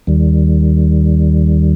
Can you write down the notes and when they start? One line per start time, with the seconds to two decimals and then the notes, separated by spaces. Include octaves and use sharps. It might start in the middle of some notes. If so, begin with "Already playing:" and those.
0.07 D#2 D#3 G3